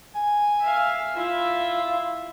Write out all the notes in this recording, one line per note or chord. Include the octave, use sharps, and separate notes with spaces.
G#5
E5 F5
E4 F4 E5